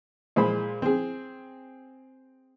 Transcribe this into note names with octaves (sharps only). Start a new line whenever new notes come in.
A#2 G#3 C5 B5
C4 G#4